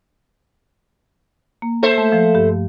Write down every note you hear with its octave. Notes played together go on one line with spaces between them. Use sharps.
A#3
A4 C5 E5
A3
F3 F5
G2 G4